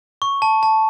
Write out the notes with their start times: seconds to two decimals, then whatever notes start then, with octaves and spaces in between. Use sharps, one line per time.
0.22 C#6
0.42 A5
0.63 A5